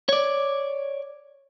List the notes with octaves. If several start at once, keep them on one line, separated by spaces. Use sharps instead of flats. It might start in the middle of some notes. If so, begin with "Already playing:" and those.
C#5 D5